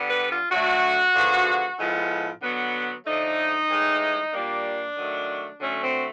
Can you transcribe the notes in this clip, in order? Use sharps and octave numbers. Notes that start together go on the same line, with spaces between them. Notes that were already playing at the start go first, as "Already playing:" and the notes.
Already playing: D3 G3 B3
B4
F4
D3 F#3 A3 F#4
D3 F3 G#3 B3
A2 F3 G#3 B3
D3 F#3 B3
D3 F3 A3 D#4
A2 E3 G#3
A#2 G3 A#3 D4
D#3 F#3 A3
D3 F#3 A3 C#4
C4